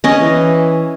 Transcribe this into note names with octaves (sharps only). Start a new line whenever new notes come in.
C#4 D#5
E3